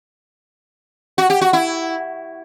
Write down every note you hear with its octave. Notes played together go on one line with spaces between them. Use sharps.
F#4
G4
F#4
E4